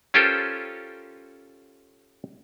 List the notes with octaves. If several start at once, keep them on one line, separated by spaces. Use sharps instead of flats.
C#4 F4 G4 A4 A#4 C5